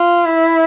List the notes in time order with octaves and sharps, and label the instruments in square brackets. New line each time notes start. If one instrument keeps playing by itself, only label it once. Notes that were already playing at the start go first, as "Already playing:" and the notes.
Already playing: [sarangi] F4
E4